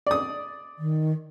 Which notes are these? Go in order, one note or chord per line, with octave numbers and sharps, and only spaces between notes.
D5 D#6
D#3